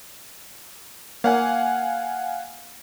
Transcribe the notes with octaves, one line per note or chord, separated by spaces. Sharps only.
A#3 F5 F#5 G#5